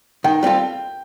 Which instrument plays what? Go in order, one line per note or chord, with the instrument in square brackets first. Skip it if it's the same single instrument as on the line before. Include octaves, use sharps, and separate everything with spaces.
[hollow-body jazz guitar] D#3 [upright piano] G5
[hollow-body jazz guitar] G3 C4 F4 A4